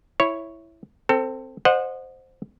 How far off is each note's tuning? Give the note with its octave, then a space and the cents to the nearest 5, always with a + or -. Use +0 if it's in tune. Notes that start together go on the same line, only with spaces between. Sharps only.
E4 +0 C#5 -5
C4 +0 A4 +25
C5 +0 D#5 -30 F#5 -20